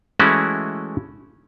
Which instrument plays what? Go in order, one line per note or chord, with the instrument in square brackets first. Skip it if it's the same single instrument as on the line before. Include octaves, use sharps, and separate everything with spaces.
[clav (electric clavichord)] E3 G#3 A3 C#4 E4 F#4